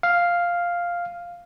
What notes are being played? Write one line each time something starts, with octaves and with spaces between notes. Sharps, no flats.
F5